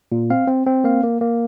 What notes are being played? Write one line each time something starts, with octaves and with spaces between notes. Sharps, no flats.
A#2
C4 F5
C4
C4
A#3 F5
A#3
A#3